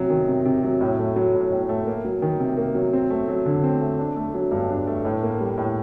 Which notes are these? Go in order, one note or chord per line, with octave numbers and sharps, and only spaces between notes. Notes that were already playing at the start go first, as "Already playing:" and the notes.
Already playing: C3 F#3
D#3
C3
C3
F#3
A2
A3
F#3
A2
A2
A3
A#3
F#3
D#3
C3
A#3
F#3
C4
A3
F#3
D3
C4
A3
D4
A3
F#3
G2
D4
A3
A2
A#3
G3
A2